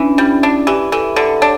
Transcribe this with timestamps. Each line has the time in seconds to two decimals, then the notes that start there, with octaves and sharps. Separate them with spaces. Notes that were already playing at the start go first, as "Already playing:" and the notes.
Already playing: E3 C#4 D4
0.18 G3 E4
0.43 D4
0.67 E3 G4
0.92 E3 A4
1.16 D3 A4
1.41 D4 C#5